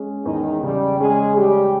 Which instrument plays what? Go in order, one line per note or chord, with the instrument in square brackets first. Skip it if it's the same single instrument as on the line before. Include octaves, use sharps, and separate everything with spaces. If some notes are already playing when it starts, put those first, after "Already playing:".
Already playing: [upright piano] G#3 C#4
[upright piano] E2 [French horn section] D#3 D#4
[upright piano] C#3 [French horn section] G3 G4
[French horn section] G#3 G#4 [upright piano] C#4
[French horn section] G3 G4 [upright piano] G#3